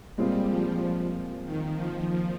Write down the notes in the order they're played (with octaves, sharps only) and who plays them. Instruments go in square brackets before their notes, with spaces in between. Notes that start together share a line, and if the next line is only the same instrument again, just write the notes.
[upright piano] A#2 G#3 C4 F4 G#4 [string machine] G3
[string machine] F3
D#3
F3
F3